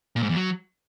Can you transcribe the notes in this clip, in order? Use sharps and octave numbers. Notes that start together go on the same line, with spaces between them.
A#2
G#2
E2
F#3